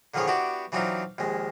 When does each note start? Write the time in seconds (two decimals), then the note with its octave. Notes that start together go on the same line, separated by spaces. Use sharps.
0.14 D3 D#3 F3 B3 G#4 C#5
0.28 B3 D4 E4 F#4 G4
0.72 E3 F#3 C4 D4 D#4 F4
1.18 A#1 D#2 G#3